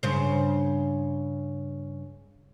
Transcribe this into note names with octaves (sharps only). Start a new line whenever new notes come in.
G2 C#3 C5